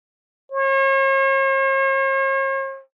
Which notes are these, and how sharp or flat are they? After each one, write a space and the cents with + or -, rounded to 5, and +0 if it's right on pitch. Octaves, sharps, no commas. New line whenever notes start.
C#5 -45